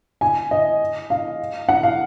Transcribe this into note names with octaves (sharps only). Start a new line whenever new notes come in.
G#5
D#5
F5
F#5
F5